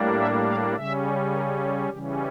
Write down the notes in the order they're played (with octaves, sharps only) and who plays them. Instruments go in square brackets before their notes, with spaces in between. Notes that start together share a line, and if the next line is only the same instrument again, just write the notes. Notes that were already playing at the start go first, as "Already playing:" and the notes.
Already playing: [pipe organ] A2 G3 A#3 D4
E5
F5
C#3 G3 C#4 E5
A#4
A4
C#3 E3 G3 C#4 G4